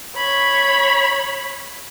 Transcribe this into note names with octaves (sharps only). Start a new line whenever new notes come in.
C#5 B5